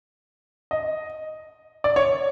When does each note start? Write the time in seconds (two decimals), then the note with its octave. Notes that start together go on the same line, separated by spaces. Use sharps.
0.71 D#5
1.84 D5
1.96 C#5